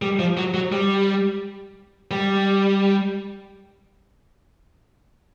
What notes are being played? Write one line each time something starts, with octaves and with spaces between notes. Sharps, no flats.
G3
F3
F#3
F#3
G3
G3